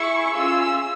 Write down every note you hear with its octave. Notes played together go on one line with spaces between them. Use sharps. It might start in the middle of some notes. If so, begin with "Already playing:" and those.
Already playing: E4 G#4 C#6
C#4 F4 G#4 E6